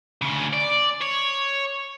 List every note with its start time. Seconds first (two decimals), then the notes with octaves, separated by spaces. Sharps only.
0.22 D2 C#3
0.53 D5
1.01 C#5